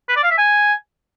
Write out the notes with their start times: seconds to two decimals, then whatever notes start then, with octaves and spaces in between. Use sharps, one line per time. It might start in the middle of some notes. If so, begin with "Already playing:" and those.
0.09 B4
0.16 D5
0.23 F5
0.31 E5
0.38 G#5